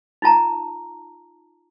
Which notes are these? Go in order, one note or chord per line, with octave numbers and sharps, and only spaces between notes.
D#4 F4 A5 A#5